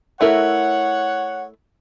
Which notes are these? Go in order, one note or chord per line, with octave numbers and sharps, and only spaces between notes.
A3 E4 A#4 C#5 F#5